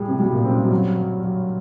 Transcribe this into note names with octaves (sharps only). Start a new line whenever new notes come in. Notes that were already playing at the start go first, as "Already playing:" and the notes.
Already playing: A2 G3 G#4
C3
B2 G3
A#2
F#2 C4
G2
F#2
G2 F#3
F#3
F#3